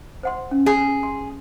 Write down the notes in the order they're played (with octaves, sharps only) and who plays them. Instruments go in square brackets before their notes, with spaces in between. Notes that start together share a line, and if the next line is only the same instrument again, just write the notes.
[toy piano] C5 F#5 C6
C#4
[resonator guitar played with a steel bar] G#4
[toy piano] C6